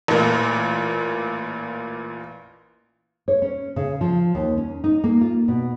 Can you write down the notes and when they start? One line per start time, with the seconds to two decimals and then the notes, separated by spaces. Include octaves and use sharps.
0.08 A1 A#2
3.28 C#5
3.42 C#4
3.76 C#3
4.01 F3
4.35 D#2
4.58 C#4
4.84 D#4
5.04 A#3
5.21 F4
5.48 B2